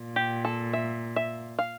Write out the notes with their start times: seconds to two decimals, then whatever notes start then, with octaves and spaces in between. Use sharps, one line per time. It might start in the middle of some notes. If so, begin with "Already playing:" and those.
Already playing: A#2
0.16 G4
0.45 A4
0.73 E5
1.16 E5
1.59 F5